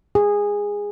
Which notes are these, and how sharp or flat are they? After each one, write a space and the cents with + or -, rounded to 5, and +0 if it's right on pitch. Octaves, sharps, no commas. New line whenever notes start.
G#4 -15